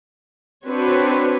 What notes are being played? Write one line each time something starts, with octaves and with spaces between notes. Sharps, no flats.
C4 D4 F#4 B4 C#5